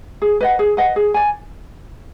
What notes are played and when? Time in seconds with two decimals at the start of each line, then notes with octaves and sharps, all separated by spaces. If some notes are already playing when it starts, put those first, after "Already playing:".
0.22 G#4
0.41 B4 D#5 F#5
0.59 G#4
0.77 B4 D#5 F#5
0.96 G#4
1.14 D5 G#5